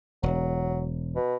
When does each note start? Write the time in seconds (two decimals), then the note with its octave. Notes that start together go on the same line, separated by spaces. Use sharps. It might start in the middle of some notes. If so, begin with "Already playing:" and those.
0.23 E1 F#3
1.16 B2